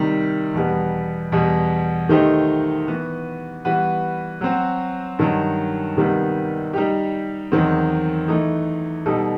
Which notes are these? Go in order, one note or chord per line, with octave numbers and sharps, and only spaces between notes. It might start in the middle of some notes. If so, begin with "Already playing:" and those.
Already playing: C3 D#3 G3 D#4
E2 B2 G3 B3
E2 B2 G3
D#3 A3 D#4 G4 C5
E3 B3 F#4
E3 G3 B3 F#4 B4
F#3 C4 F#4
G2 D#3 F#3
C3 D#3 G3 B3
G3 D#4 G4
E2 D#3 F#3 C4
E3 A3 D#4
B2 G3 D#4 A4